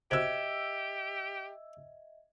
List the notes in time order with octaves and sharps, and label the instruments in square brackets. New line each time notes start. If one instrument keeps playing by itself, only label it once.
[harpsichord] C3 F#4 [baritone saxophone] G4 [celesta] D#5 E5 [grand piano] E6 G#6